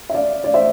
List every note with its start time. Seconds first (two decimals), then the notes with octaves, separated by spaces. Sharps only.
0.10 E5
0.14 D5 F5
0.44 D5
0.54 C5 E5